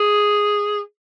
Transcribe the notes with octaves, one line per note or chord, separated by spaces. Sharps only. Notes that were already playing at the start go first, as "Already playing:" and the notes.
Already playing: G#4